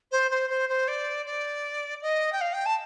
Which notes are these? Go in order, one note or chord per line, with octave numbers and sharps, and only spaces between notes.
C5
C5
C5
C5
D5
D5
D#5
G5
F5
G5
A5